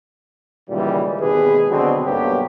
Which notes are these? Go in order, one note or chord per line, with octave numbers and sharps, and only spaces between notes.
C#2 A#2 D#3 E3 G3
G#1 D#2 B2 G#4 B4
B2 D3 F#3 C4
B1 G2 F#3 A#3 B3 G4